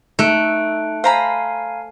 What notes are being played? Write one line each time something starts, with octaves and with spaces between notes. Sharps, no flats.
A3 D#4 F#6 D7
C5 F5 G#5 A#5 B5